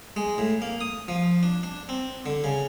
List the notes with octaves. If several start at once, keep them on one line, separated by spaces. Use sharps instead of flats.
G#3
A2
A#3
D#6
F3
D4
D4
C4
D3
C#3